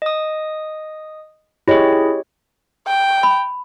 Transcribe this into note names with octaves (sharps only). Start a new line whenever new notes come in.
D#5 D#6
E4 G4 G#4 C#5 D#5
G5
B5